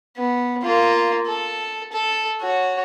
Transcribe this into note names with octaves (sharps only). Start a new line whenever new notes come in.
B3
A#3 F4
A4
A4
F#4 C#5